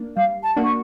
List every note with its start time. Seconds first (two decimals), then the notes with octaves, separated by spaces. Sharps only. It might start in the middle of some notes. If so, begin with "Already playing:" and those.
Already playing: A#3 D4
0.17 G3 F5
0.43 A5
0.56 A#3 D4 F#4
0.64 C#6